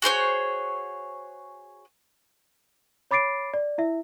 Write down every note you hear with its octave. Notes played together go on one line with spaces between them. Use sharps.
F#4 G#4 C5 C#5
C#5 B5 D6 A6 C7 D7
D5
E4 E5